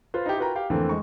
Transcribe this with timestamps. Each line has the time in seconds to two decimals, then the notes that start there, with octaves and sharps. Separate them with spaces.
0.14 F4 B4 C5
0.26 D#4 E4 G4
0.38 F4 F#4 A#4 B4 G5 A#5
0.55 G4 F5 G5
0.70 F2 D3 E3 A3 A#3 C4
0.89 G#3 C#6